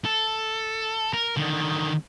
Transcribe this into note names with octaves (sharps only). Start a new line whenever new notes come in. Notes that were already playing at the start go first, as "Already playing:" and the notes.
A4
A#4
D3 D#3